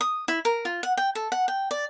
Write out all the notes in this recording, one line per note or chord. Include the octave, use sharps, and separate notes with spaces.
D#6
E4
A#4
F4
F#5
G5
A4
F#5
G5
D5